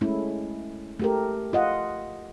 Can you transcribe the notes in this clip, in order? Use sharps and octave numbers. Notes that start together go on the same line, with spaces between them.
G#3 A3 C#4 E4
A3 G4 A#4
F4 D#5 F#5